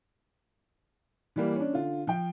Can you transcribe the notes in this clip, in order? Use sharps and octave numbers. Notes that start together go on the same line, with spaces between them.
E3 G3 A#3
C#4 D4
D3 F4
F3 G5